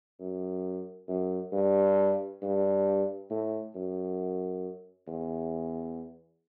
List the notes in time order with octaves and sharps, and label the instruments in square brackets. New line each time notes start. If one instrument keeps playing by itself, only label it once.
[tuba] F#2
F#2
G2
G2
A2
F#2
E2